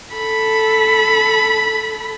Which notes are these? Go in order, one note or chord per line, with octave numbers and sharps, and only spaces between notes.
A4 B5